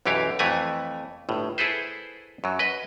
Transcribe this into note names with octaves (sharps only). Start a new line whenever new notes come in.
B1 F#2 E3 G4 C#5 F5
F2 E3 A3 B4 G#5 A#5
G1 A2
E4 G#4 A4 B4 C5
F#2 F#3
B4 D#5